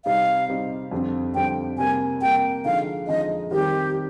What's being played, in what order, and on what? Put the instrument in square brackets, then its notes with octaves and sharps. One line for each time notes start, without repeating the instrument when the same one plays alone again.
[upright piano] C3 G3 C4 D#4 [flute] F5
[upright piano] C3 G3 C4 D#4
F2 D3 G3 C4
[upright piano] F2 D3 G3 C4 [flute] G5
[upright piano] C3 G3 A#3 [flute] G#5
[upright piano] C3 G3 A#3 [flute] G5
[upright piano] D3 F3 G#3 D#4 [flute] F5
[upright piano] D3 F3 G#3 D#4 [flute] D#5
[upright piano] D#3 G3 C4 D#4 [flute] G4